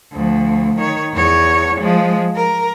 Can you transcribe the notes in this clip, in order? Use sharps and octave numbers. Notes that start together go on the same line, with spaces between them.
D2 F3
D#3 C#5
E2 C#5
F3 G#3
A#4